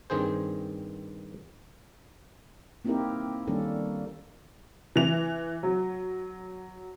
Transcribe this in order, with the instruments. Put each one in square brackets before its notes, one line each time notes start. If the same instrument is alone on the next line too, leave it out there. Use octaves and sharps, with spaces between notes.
[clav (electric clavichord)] G2 D#3 C4 G#4 C5
[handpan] A#3 C4 D#4 E4 G4 A#4
D#3 G3 A#3 C#4 D4 A4
[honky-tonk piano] E3 F7
F#3